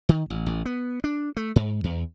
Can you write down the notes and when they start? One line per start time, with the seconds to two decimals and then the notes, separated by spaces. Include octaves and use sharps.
0.09 D#3
0.30 A1
0.46 A1
0.65 B3
1.04 D4
1.37 A3
1.56 G#2
1.84 E2